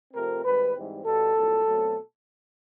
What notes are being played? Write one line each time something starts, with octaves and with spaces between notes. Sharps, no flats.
F2 C3 F3 A3 C4 A#4
G#2 D#3 G3 C4 B4
G#2 E3 G3 C4
B2 G3 B3 A4
C2 A#2 F#3
B2 F#3 A3 C4